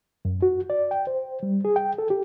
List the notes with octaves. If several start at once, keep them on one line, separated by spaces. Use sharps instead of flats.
F#2
F#4
D5
G5
C5
G3
G#4
G5
A4
G4